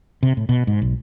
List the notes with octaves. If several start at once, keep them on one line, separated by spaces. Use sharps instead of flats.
C3
A2
B2
G#2
B1